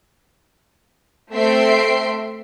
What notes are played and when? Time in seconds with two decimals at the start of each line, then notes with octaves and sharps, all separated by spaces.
1.32 A3 C4 E5 C6 C7 D7